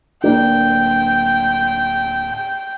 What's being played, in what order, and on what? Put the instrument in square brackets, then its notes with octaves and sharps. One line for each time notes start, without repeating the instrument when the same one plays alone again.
[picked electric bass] D1 A#3 D4 [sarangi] G5